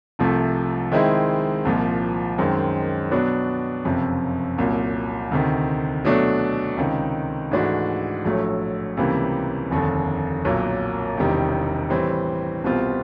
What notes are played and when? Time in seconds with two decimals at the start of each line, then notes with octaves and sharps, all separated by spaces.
0.19 C2 C3 F3 A3
0.92 D#3 G#3 C4 E4
1.65 C2 A#2 F3
2.38 F#2 D#3 G#3 C4
3.11 B2 F#3 B3 D4
3.85 F#1 F2 C3
4.58 C2 A#2 F#3
5.31 D2 C3 D#3
6.04 B2 F#3 A3 D4
6.77 C#2 C3 D#3
7.51 G#2 E3 A3 D4 F#4
8.25 A#1 A2 F#3 A3
8.97 C#2 C3 E3 G3 A#3
9.71 F1 D#2 D3
10.45 B1 A#2 F#3 A#3
11.17 E1 E2 C3 D#3 G3
11.90 A2 E3 G3 C4
12.64 C2 B2 G3 C4 F4